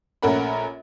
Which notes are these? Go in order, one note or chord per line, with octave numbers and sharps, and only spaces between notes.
A#1 A3 C#4 A#4 F#5 B5